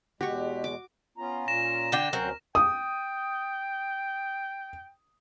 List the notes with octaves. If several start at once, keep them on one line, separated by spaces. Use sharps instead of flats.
E2 B2 G#3 F#4 G4 C#6
D6
B3 C#4 F4 A#5
A#2 A#6 E7
D3 D4 G5
D2 F#3 C4 C#4 A#4
G5 D#6